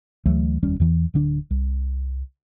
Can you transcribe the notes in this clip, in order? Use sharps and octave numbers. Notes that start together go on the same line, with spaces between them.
D2 E3 F#3 A3
F1 D#2 G3 C#4
E2 E3
D1 D3 D4
C2